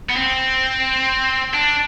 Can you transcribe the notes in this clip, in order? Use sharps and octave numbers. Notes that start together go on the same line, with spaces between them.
B3
C4
D4